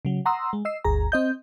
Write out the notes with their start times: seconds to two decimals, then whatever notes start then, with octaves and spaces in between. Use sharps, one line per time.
0.05 C#3 F#3
0.26 F#5 A#5 C6 D#6 E6
0.53 G#3
0.65 D#5 E6 C7
0.84 G1 D2 G#4 A#5
1.12 C4 D#5 G6